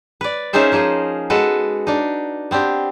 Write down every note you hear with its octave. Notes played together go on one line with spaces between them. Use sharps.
B4 D5
A#3 C#4 D#4 G#4 C5 E5
F3 A#3 G#4 D#5
G#3 B3 F#4 A4 B4
D4 D#4
B3 C4 D4 G4